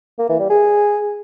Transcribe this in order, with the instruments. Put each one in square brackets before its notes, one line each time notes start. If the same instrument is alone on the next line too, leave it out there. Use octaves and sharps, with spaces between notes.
[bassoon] A#3
E3
G3
G#4